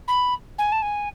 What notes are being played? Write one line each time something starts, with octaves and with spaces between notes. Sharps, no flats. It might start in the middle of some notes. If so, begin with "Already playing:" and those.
B5
G#5
A5
G#5